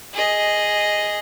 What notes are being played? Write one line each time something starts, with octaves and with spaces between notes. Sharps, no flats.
G#4 D#5